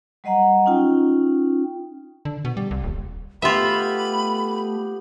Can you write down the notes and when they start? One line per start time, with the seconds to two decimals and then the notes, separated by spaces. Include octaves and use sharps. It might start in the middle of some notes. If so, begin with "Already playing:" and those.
0.24 F#3 G3 D#5 F#5 A#5
0.66 C#4 D#4 F4 G5
2.25 D3
2.45 B2
2.57 G3
2.71 C2
2.84 D#1
3.42 A3 B3 F4 G4 E5 B5